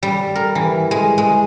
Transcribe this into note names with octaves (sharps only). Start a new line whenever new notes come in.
G3
A#4
E3
G#3
G#3